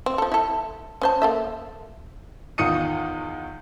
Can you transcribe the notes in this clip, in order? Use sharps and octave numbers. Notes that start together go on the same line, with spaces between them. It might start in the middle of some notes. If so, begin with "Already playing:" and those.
C4
F3 A4
E4 A4
C#4 C5 A5
A#3 A4 E5
E2 D#3 F4 D#6 C#7 D#7